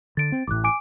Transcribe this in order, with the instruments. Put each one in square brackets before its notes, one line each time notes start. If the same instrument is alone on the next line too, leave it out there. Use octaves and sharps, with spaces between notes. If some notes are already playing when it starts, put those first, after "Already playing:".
[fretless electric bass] D3 [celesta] A6 D7
[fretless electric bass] C4
[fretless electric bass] A1 A2 [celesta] D6 F#6
[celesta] G#5 D6 D7